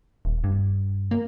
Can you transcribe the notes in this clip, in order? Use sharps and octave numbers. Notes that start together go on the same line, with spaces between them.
D#1
G2
A#3